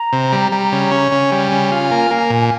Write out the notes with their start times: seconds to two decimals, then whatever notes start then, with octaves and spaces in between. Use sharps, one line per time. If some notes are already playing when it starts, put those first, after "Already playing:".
Already playing: A#5
0.13 C3
0.32 G3
0.52 G3
0.72 C#3
0.91 C#4
1.11 C#3 G#5
1.32 G3
1.52 C#3
1.72 F4
1.91 A#3
2.11 A#3
2.30 A#2